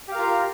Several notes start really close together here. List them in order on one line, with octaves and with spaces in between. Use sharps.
G4 F5 A#4 F4